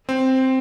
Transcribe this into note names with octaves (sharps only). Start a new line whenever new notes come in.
C4